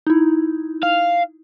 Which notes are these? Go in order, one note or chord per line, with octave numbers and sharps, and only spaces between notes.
D#4 E4
F5